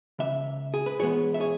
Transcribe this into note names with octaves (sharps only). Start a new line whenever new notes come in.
C#2 C#3 E5
G#4
B4
G#2 E3 G#3 B3 G#4 C#5
E5
G#4 C#5